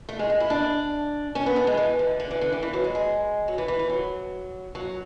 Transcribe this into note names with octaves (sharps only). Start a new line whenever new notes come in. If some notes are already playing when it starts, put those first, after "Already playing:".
A3
G#3
G#3
E4
D4
C#4
B3
A3
G#3
E3
D3
D3
E3
D3
E3
E3
F#3
G#3
G#3
F#3
E3
E3
E3
F#3
F#3